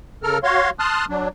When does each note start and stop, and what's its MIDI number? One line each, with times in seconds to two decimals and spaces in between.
0.23 0.38 49
0.23 0.38 69
0.23 0.38 70
0.23 0.38 89
0.43 0.70 66
0.43 0.70 73
0.43 0.70 77
0.43 0.70 84
0.79 1.05 81
0.79 1.05 84
0.79 1.05 87
0.79 1.05 89
0.79 1.05 90
1.09 1.28 54
1.09 1.28 62